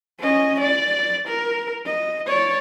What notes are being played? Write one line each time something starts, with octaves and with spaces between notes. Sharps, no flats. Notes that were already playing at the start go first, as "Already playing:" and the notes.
C#4 D#5
D5
A#4
D#5
C#5 D5